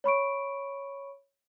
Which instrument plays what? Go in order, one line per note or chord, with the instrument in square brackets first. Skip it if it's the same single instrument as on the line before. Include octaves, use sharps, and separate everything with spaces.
[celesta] C#5 B5 C#6 D7